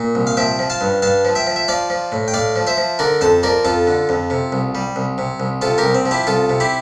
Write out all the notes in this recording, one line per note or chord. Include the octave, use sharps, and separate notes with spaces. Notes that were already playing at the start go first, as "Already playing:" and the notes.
Already playing: A#2
C2
F5
F3 E5 G5
F3
F5 A5
G2
G2 F5 A5
F3
E5 G5
F3
E5
F3 D5 F5
F3
A2
G5
A2 D5 F5
F3
C5 E5
F3
D3 A#4 D5
F2 A4 C5
F3 A#4 D5
F2 F4 A4
D3
F2
C3
C2
G3
C2
C3
C2
C3 F4 A4
G4 A#4
C2
C4
F3
E4 G4
C2 F4 A4
C3
E4 G4